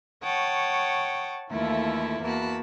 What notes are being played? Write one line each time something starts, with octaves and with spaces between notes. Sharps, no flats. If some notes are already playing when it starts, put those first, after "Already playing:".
C#5 F#5 G5 A5 C#6 D#6
D#2 E3 A3 E4 F4 A4
E2 A#3 F#4 A5 B5